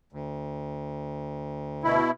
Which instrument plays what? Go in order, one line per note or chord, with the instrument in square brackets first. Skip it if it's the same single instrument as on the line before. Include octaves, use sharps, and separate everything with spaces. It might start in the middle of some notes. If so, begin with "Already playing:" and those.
[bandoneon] D2
[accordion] B2 E4